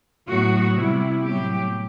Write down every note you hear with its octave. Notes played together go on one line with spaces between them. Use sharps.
A2 F#3 B3 F#4
C3 G3 B3 E4
A2 F#3 B3 G4